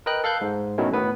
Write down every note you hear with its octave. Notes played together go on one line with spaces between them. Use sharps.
A#4 B4 D#5 G5 F#6
A4 F5 F#6 G6
G#2
B2 D#3 F#3 A3 C#4 E4
A2 B3 B4